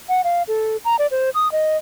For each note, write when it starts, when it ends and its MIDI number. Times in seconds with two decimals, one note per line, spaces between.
0.09 0.21 78
0.24 0.43 77
0.48 0.77 69
0.85 0.96 82
0.99 1.07 74
1.11 1.30 72
1.35 1.51 87
1.52 1.77 75